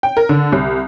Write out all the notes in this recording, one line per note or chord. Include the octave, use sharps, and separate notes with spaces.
G5
A#4
D3
C2